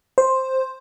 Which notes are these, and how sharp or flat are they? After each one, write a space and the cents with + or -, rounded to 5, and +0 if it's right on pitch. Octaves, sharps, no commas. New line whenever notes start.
C5 +5